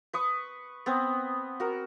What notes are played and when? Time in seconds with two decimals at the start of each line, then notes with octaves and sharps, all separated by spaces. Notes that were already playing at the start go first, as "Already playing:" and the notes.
0.13 B4 C#6 D#6
0.86 B3 C4 B4
1.60 F#4 A#4